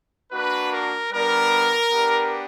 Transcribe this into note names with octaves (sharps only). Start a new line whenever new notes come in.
A#3 D4 F#4 B4
A#4
G3 B3 D4 A#4
B3 D4 G4